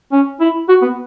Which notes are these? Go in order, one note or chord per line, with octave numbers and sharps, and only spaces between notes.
C#4
E4
F#4
B3